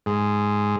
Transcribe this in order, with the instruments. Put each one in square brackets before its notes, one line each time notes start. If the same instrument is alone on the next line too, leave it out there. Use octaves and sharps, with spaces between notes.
[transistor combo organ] G#2